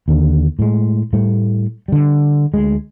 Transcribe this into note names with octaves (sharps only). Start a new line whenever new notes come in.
D#2 D3
A2 G#3
A2 G3 A3
D3 G3
D2 G#3